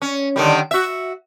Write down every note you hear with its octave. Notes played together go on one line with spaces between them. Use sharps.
C#4
D3 D#3 G3
F#4 E5